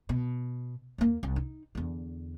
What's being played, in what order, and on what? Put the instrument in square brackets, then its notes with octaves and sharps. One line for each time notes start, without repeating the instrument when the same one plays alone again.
[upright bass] B2
D#2 A#3
C2
D#4
E2 D3